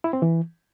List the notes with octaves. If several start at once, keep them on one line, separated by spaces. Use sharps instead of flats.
E4
C4
E3